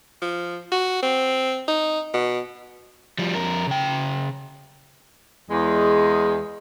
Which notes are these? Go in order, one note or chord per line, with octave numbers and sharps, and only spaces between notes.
F3
F#4
C4
D#4
B2
F3 G3
F2 A#4
C#3 G5
E2 G#3